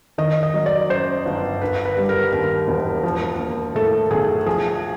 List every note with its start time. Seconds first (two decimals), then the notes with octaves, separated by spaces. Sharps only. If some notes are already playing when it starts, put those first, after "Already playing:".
0.18 D#3 D#5
0.43 D#5
0.54 F#3
0.66 D5
0.89 F#2 C5
1.25 G1
1.61 D3 B4
1.85 B4
1.97 G3
2.09 A#4
2.32 D#2 A#4
2.68 E1
3.03 F3
3.39 A#3
3.75 A2 A4
4.11 B1 G#4
4.46 F3 G#4